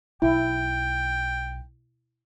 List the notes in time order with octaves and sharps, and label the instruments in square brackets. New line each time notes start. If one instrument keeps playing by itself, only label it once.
[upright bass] B1 [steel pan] E4 [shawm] G5